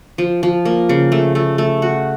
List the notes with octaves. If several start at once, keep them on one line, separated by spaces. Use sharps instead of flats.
F3
F3
A#3
C#3
A3
A3
A3
F#4